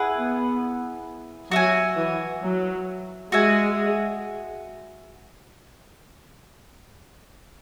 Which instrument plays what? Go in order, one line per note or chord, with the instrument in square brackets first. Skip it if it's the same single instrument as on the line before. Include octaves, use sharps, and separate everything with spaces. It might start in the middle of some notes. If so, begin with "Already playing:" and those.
Already playing: [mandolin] E4 G#4 B4 F#5
[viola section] B3
[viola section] F#3 [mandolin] F#4 E5 G#5
[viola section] E3
F#3
[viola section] G#3 [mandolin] F#4 E5 G#5